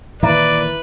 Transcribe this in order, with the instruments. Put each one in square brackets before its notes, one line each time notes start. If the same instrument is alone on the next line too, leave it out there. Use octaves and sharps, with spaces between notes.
[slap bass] A#2 D#3 E3 [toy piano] E4 E5 A#5 [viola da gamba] B4 [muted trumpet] D5